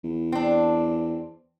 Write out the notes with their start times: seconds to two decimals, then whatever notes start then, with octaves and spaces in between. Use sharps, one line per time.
0.04 E2
0.32 C4 D4